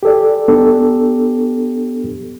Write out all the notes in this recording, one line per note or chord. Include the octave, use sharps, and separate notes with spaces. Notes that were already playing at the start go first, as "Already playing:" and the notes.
G4 A4 D5
B3 D4 G4 A4